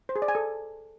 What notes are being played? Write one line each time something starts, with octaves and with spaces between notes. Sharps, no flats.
C5
G#4
D5
G#5
A4